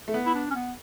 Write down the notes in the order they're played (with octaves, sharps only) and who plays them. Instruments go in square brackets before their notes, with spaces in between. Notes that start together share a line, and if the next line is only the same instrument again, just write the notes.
[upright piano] A3
B3
[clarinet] E4
D4
C#4
B3